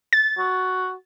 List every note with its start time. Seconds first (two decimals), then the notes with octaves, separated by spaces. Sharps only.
0.13 A6
0.38 F#4